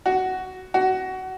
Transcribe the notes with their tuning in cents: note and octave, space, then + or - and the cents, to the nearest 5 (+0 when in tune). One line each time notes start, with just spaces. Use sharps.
F#4 +10
F#4 +20